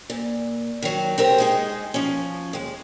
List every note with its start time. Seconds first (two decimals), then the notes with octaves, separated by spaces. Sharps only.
0.10 A#2
0.82 D#3 F#3
1.18 C4 G4 A#4 C5
1.38 G#3 D#4 G#4
1.94 F3 C#4
2.53 D#2 G#3